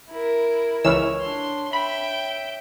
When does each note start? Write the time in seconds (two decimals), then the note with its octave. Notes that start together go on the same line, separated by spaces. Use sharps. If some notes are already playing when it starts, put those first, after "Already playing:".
0.10 E4 A#4
0.84 C#2 E3 C#5 E6 F6 G#6
1.21 D4 C6
1.73 E5 G5 B5